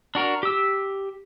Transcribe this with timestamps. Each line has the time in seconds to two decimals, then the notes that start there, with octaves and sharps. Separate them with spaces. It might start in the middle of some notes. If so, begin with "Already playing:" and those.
0.15 D4 F#4 A#4
0.43 G4 E6